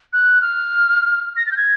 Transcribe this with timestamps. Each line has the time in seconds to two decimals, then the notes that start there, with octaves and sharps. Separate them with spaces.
0.13 F#6
0.41 F6
1.37 A#6
1.46 A6
1.52 G6
1.57 G#6